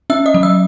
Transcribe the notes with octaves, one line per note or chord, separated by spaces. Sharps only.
C#4 E5 E6
D#5 D#6
F#3
E5 E6